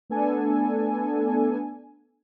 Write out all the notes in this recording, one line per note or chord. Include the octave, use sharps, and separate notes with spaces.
A3 B3 D4 A4 G#5